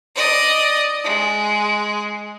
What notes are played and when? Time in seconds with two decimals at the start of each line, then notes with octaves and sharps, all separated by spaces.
0.15 D5 D#5
1.04 G#3